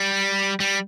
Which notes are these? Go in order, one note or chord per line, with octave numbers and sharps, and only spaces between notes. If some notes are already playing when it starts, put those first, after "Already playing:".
Already playing: G3
G3